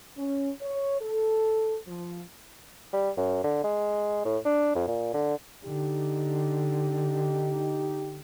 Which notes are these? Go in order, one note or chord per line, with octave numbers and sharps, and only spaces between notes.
C#4
C#5
A4
F3
G3
F#2
D3
G#3
A2
D4
F2
A#2
D3
D3 D#4 G4